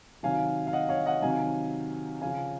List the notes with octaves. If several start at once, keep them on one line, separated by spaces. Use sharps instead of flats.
C3 D#3 F#3 F5 G#5
F5
D#5 F#5
C#5 F5
D#5 F#5
C3 D#3 F#3 F5 G#5
C#3 F3 F5 G#5